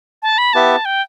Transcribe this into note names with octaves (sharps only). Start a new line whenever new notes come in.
A5
B5
B3 E4 G4 B4 E5 A5
G5